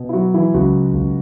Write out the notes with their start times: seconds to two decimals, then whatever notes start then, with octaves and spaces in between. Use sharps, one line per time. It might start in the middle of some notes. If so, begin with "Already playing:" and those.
Already playing: B2
0.09 E4
0.13 F#3 F#4
0.34 E3 E4
0.54 C#2 F#3 F#4
0.94 C#2